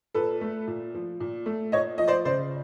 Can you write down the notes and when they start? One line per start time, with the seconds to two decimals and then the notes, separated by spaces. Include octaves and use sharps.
0.14 A#2 A4 B4
0.41 A3
0.67 A#2
0.94 F3
1.20 A#2
1.46 A3
1.72 A#2 C#5 D#5
1.98 F3 D#5
2.08 C5 D5
2.25 C#3 C5 D5